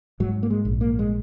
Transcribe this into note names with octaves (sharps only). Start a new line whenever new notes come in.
G#2 F#3
A#3
G#3
A#1
A#3
G#3